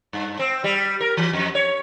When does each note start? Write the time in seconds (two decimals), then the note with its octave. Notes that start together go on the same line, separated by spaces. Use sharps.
0.13 G2
0.39 C4
0.64 G3
1.01 A#4
1.17 E3
1.33 F2
1.55 C#5